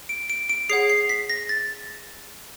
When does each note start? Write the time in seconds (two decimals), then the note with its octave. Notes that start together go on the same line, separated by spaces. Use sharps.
0.09 D7
0.30 D7
0.49 D7
0.69 G#4 C#5 F#5 C7
0.89 C7
1.09 B6
1.30 A#6
1.49 A6